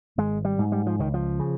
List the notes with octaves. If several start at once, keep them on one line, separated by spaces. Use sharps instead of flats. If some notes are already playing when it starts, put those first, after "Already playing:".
G#1 G#3
G3
G#2
G3
F3
C#2 D#3
F3
C#3